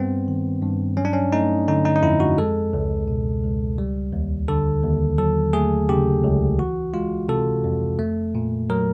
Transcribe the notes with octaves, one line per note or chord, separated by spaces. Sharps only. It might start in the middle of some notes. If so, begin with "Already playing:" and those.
Already playing: G2 G3 B3 C4
D#3
G2
F#3 C#4
D4
C#4
A3 D#4
D3 D#4
D#4
D#4
F2 E4
F#4
G#3 A4
C#2
B2
C#2
G3
D#2
D3 A4
D#2
F#3 A4
A3 G#4
C#3 G4
C#2
E3 F#4
G#3 F4
C3 A4
F2
A3
A#2
F#3 A#4